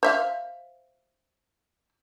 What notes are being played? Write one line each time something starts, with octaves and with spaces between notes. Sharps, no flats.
C5 E5 F5